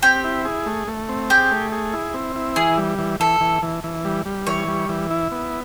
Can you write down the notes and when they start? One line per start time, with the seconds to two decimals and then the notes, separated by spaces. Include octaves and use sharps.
0.03 C4 G4
0.24 E4
0.45 G#4
0.66 A3
0.88 A3
1.09 C4
1.30 G4 G#4
1.51 A3
1.72 G#4
1.93 E4
2.14 C4
2.36 E4
2.56 E3 G#4
2.78 G3
2.99 E3
3.20 E3 A4
3.41 E3
3.63 E3
3.84 E3
4.05 G3
4.26 G3
4.47 E3 C#5
4.68 G3
4.89 E3
5.11 E4
5.32 B3